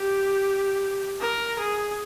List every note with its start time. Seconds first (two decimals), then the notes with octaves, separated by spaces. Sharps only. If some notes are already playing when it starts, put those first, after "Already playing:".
Already playing: G4
1.21 A#4
1.59 G#4